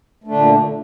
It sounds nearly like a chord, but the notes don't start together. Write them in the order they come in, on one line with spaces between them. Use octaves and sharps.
A3 D4 D3 A#2